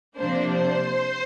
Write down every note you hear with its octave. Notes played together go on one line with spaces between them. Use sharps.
C3 F3 A#3 D4 C5
C5